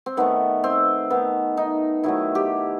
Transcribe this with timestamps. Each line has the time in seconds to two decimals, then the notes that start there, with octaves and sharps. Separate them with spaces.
0.06 C4
0.17 D#3 A3 B3
0.64 C4
1.10 D#3 A3 B3
1.57 D#4
2.04 D#3 F#3 A3 E4
2.35 G4